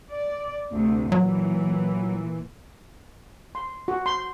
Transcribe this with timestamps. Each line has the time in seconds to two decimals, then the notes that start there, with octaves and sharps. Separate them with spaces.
0.10 D5
0.70 D2 C3
1.12 A#2 E3 F#3
3.55 C6
3.88 F#4
4.06 C6